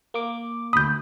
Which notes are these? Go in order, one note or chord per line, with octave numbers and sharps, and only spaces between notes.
A#3 D6
D2 B5 D#6 G6